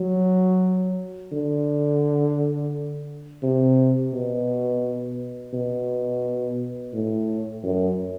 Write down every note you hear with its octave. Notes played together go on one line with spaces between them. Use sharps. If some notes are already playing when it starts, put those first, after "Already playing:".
Already playing: F#3
D3
C3
B2
B2
A2
F#2